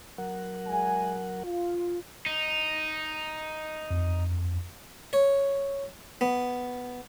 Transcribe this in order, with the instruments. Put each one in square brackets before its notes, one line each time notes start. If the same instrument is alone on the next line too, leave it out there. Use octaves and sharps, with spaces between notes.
[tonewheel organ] F#3 A#4 F#5
[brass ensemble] G#3 G#5
F4
[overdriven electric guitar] D#4
[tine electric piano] F2
[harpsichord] C#5
B3